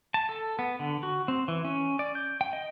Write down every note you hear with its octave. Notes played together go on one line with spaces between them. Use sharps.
A5
A4
B3
D3
F#4
C4
E3
C#4
D5
G6
G5
D#5